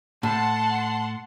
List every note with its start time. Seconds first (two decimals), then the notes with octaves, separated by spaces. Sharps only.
0.23 A2 F#5 A5 C6